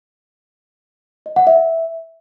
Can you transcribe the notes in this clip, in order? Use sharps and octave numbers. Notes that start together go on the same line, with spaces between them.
D#5
F#5
E5